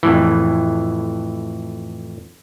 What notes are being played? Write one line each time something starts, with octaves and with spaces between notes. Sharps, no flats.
F2 A2 E3